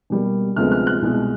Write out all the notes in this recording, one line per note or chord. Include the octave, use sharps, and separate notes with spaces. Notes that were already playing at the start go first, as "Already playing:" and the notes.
B2 G3 A#3
D2 C3 F3 G#3 B3 F6
F6
F#6
C2 B2 G#3